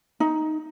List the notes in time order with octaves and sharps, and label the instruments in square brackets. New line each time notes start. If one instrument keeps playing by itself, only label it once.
[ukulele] D#4